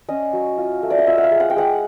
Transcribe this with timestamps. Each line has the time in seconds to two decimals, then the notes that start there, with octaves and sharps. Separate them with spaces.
0.09 C#4 D#5
0.33 F#3
0.58 F4
0.83 A3
0.90 D5
0.99 D#5
1.07 F4 E5
1.18 F#5
1.24 F5
1.31 G#3
1.40 F#5
1.50 G5
1.56 G#3 F#5